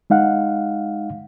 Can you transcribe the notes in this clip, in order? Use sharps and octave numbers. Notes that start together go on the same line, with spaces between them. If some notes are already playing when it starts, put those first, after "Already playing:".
G#3 D#4 F5 F#5